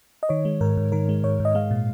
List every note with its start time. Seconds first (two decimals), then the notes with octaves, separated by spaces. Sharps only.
0.23 D#5
0.29 D#3 C#5
0.45 G#3
0.61 G#2 A#4
0.77 G#2
0.92 D#3 A#4
1.09 G#3
1.24 G#2 C#5
1.40 G#2
1.45 D#5
1.55 G#3 F5
1.71 A#2